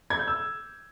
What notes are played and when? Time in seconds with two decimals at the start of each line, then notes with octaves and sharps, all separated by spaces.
0.10 G#6
0.19 G6
0.27 E6